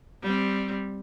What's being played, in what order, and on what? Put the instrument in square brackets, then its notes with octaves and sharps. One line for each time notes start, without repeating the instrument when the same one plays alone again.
[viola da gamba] G3 C4